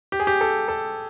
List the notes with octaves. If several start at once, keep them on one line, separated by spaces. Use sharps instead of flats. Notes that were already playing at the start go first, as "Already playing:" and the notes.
G4
G#4
G4
A4
A4